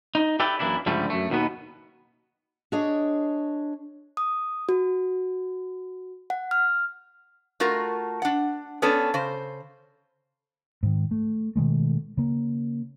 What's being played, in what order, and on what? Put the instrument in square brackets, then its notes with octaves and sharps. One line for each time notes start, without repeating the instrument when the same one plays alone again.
[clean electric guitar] D#4
G4 A4 B4 D5 E5 G5
F#2 E3 A#3 D4 E4
C#2 G2 D3 F3 G3 A3
F#2 A3
D#2 B2 D#3 B3
[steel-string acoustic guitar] D4 G#4 C#5 D#5
[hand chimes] D#6
F#4
F#5
F6
[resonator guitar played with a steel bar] A3 F4 F#4 A#4
D4 F#5
B3 C#4 D4 A4
C#3 C5
[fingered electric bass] G#2 D#3
A3
B2 D#3 G#3 A3
C#3 A#3